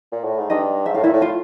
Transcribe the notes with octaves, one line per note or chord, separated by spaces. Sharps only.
A#2
A2
G#2
G2 D#4 D#5
G#2 E5
A2 F5
A#2 E4 E5
A2
F4 F5